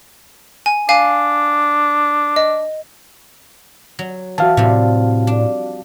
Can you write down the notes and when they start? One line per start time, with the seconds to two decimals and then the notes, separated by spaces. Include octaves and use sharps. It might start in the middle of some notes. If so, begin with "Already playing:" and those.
0.66 G#5
0.89 D4 F5 G#5
2.36 D#5
3.99 F#3
4.38 E3 F#4 F5 A5
4.57 A2 C3 F3 G3
5.27 D4